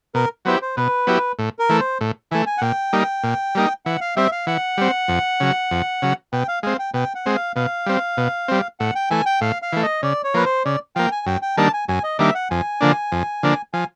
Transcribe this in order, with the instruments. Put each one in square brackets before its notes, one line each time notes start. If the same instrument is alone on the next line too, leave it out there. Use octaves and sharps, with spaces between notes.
[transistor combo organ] B2 [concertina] A#4
[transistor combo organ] F#3 B3 E4 G4 [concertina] C5
[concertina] C5
[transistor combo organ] B2 [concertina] B4
[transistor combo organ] F#3 B3 E4 G4
A2
[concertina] A#4
[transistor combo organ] E3 A3
[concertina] C5
[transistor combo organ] A2
[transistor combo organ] E3 A3 [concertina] G#5
[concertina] G#5
F#5
[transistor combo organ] A#2 [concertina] G5
[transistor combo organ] G3 A#3 D#4
A#2
G3 A#3 D#4
[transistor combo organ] E3 [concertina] F#5
[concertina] F5
[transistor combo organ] G3 C4 [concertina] E5
[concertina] F5
[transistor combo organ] E3 [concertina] F#5
[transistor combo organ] G3 C4
F2
C#3 F#3
F2
C#3 F#3
[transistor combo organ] B2 [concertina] G5
[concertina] F5
[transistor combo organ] G#3 C4 [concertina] F5
[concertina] G5
[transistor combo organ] B2 [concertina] G5
[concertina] F#5
[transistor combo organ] G#3 C4
[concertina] F5
[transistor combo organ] B2 [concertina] F5
[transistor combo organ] G3 C4
B2
G3 C4
[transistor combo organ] A2 [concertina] F#5
[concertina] G5
[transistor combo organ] E3 A3 [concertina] G#5
[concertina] G5
[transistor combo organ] A2 [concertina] F5
[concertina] F5
[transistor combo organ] E3 A3
[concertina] D#5
[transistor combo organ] C#3 [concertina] D5
[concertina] C#5
[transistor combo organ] F3 A#3 [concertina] B4
[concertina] C5
[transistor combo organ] C#3 [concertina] D5
[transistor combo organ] F3 A#3 [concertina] G5
[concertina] G#5
[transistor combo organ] F#2 [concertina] G5
[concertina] G5
[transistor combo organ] D#3 G3 A#3 D4 [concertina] A5
[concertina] G#5
[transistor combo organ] F#2 [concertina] G#5
[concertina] D#5
[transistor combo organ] D#3 G3 A#3 D4 [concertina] E5
[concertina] F#5
[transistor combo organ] F2 [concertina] G#5
[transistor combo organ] D3 F3 A#3 D4
F2
D3 F3 A#3 D4
[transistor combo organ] F3 [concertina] G#5